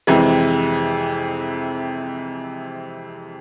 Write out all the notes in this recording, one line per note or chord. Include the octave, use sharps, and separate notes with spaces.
F2 C3 E3 G#3